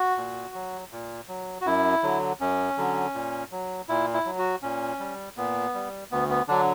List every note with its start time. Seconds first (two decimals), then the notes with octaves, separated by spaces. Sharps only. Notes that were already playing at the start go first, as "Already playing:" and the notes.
Already playing: F#4
0.17 A#2
0.55 F#3
0.91 A#2
1.28 F#3
1.61 F#4
1.65 F#2 E4
2.03 D3 F#3
2.40 F#2 C#4
2.77 D3 F#3
3.15 A#2
3.52 F#3
3.89 A#2 E4
4.13 E4
4.25 F#3
4.38 F#4
4.63 A#2 C#4
5.00 G3
5.37 A#2 B3
5.75 G3
6.11 D2 B3
6.30 B3
6.48 D3 F#3 D4